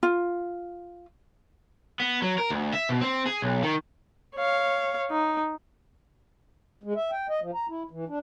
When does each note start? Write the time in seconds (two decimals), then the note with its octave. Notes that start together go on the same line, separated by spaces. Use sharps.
0.03 F4
2.00 B3
2.22 F#3
2.38 A#4
2.50 D2
2.73 E5
2.89 B2
3.01 C4
3.26 G#4
3.42 B1
3.63 D#3
4.36 C#5 F5
5.11 D#4
6.84 G#3
6.96 E5
7.12 G5
7.29 D#5
7.42 F3
7.54 A#5
7.69 E4
7.91 E3
8.08 D4